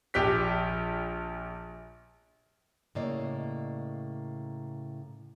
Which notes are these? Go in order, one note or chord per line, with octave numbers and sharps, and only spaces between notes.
A#1 G4 B6
A2 C#3 A#3 D5 D#5